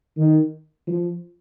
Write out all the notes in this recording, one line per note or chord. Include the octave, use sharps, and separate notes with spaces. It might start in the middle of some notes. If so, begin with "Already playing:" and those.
D#3
F3